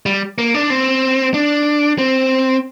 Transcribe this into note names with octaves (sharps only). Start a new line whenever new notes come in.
G3
A#3
D4
C4
D4
C4